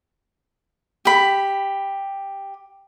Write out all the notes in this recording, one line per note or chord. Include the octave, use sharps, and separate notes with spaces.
G4 B5